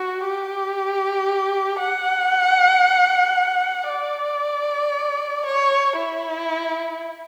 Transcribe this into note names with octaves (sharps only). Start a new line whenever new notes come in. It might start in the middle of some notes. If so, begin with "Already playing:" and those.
Already playing: F#4
G4
F#5
D5
C#5
E4